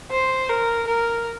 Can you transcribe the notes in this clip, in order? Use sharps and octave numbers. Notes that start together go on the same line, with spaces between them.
C5
A#4
A#4